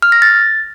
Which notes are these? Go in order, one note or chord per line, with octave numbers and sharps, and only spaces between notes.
F6
A#6
A6